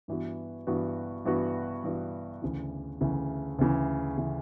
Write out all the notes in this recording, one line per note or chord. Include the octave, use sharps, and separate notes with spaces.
G2 E3 B3 F#4
G2 E3 B3 F#4
G2 E3 B3 F#4
G2 E3 B3 F#4
D2 C#3 E3
D2 C#3 E3
D2 C#3 E3
C#3 E3